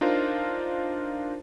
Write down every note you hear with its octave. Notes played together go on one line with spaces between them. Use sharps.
D4 D#4 F4 A#4 C5